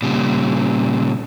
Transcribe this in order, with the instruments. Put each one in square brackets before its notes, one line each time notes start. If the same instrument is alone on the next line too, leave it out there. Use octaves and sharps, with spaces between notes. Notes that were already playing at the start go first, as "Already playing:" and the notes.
[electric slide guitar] A#2 C#3 G3